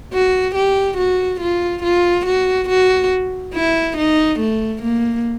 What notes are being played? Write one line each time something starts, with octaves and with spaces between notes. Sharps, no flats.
F#4
G4
F#4
F4
F4
F#4
F#4
E4
D#4
A3
A#3